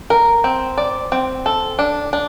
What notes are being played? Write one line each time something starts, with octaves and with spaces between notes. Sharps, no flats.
A#4
C4
D5
C4
A4
D4
D4